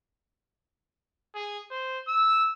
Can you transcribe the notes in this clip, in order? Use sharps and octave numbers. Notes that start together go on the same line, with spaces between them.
G#4
C5
E6